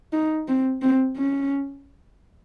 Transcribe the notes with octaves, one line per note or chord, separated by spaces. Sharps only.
D#4
C4
C4
C#4